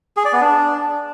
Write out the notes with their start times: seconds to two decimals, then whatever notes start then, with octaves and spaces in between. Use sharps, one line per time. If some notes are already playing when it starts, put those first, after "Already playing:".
0.17 G#4
0.25 D5
0.33 B3
0.41 D4